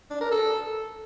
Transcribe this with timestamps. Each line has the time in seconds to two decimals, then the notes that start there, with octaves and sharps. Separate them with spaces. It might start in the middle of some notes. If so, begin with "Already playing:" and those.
0.10 D4
0.21 A#4
0.31 A4